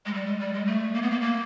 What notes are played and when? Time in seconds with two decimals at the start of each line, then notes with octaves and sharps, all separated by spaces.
0.06 G#3
0.14 G3
0.26 G#3
0.39 G3
0.54 G#3
0.66 A3
0.94 A#3
1.02 B3
1.11 A#3
1.21 A#3